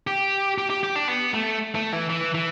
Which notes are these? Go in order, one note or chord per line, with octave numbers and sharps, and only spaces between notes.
G4
G4
G4
G4
D4
B3
A3
A3
E3
E3
E3